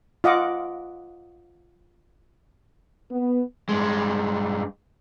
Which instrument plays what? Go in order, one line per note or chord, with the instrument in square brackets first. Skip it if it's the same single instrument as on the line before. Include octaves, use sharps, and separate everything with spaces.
[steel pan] F4 D#5 F#5 D6
[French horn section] B3
[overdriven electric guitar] G2 G#3